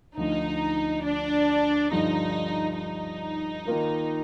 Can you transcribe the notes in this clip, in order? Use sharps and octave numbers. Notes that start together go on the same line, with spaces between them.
D2 D3 F3 D#4
D4
G2 D3 F3 D#4
D#4
D#3 A#3 F4 A#4